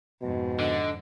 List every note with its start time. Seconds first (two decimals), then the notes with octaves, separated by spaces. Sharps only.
0.22 F2 G#2 B2
0.59 D3 D#5